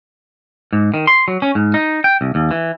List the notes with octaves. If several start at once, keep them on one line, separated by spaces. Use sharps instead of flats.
G#2
D#3
C6
F#3
C#4
G#2
D#4
G5
C2
D#2
E3